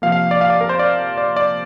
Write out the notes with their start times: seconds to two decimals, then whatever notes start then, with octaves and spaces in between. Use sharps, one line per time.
0.02 C3 F3 A#3 F5
0.12 F5
0.31 D5
0.41 F5
0.50 D5
0.61 A#4
0.69 C5
0.79 D5
1.18 D5
1.36 D5